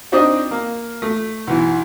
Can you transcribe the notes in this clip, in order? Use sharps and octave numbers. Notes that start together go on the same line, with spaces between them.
C4 D4 D#4 D5 D#5
A#3
A3
B1 E3